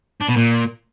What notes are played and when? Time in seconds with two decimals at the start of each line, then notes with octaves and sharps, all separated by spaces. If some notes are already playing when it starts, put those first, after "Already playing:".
0.22 D4
0.29 B2
0.37 A#2